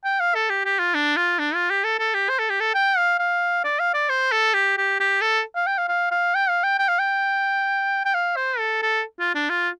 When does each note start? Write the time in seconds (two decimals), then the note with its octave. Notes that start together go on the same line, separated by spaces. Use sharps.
0.04 G5
0.20 F5
0.35 A4
0.50 G4
0.65 G4
0.79 F4
0.95 D4
1.16 F4
1.39 D4
1.54 F4
1.70 G4
1.84 A4
1.99 A4
2.14 G4
2.29 C5
2.39 A4
2.50 G4
2.60 A4
2.75 G5
2.97 F5
3.19 F5
3.64 D5
3.79 F5
3.94 D5
4.09 C5
4.32 A4
4.54 G4
4.77 G4
5.00 G4
5.21 A4
5.55 F5
5.67 G5
5.78 F5
5.89 F5
6.11 F5
6.35 G5
6.49 F5
6.64 G5
6.79 G5
6.88 F5
6.99 G5
8.05 G5
8.14 F5
8.36 C5
8.59 A4
8.82 A4
9.20 F4
9.35 D4
9.49 F4